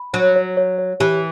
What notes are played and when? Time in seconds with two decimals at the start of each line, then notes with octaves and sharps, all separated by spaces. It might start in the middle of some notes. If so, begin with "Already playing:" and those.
Already playing: B5
0.14 F#3 C#5
0.36 C#5
0.57 C#5
0.78 C#5
1.00 E3 G4